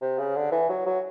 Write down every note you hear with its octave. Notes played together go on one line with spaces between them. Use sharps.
C3
C#3
D3
E3
F#3
F#3